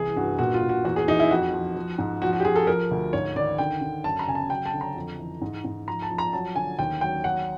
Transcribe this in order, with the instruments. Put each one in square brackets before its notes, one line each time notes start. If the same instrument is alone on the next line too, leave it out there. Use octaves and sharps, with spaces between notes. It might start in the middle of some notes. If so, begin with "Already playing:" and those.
Already playing: [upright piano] C2 E3 G#4
G2 F#4
A#2 F#4
F4
A#2
F#4
E2 F#4
G#4
E3 D#4
E4
F2 F#4
F3
F3
G#2
F3 F#4
F#4
G4
F3 G#4
A4
F3 A#4
D2
G#2 C#5
D#3 D5
D3 G5
D3
F#2 A5
A#5
C#3 G#5
A5
F#3 G5
A5
D3
A#5
F2
E3
G#2
G#2
F3 A#5
A5
F3
A#5
F#3 A5
D3 G#5
D#2 G5
F#3 G5
F#3 F#5